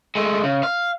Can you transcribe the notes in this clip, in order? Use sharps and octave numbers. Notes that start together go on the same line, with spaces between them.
G#3 A3
C#3
F5